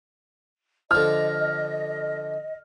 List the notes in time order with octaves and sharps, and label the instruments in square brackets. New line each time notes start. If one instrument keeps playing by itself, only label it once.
[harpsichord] D3 F3 [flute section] D#5 [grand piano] F6